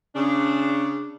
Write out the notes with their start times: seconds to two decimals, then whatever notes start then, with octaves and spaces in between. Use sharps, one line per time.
0.16 C#3 D4